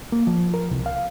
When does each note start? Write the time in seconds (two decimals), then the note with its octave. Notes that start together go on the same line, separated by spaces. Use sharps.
0.12 A#3
0.27 F3
0.54 A#4
0.71 C2
0.86 F5